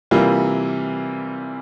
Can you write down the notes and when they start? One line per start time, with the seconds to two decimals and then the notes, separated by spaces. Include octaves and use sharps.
0.11 C3 E3 G3 A#3 F4